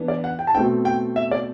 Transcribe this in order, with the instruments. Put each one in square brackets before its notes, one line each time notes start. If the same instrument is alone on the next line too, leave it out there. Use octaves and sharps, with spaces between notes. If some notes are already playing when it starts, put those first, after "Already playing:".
Already playing: [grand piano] E3 B3 D4
D5
F#5
G5
A5
B2 A3 C4 G5
G5
E5
D5